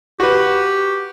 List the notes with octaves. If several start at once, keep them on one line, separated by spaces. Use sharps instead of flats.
F#4 G4 B4